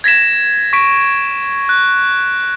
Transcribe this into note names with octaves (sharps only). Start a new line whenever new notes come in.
G#6 A#6 B6 E7
C#6 B6 D7
F#6